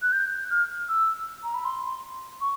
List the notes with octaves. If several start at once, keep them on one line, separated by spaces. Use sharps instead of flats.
F#6
G6
F6
E6
A#5
B5
C6
C#6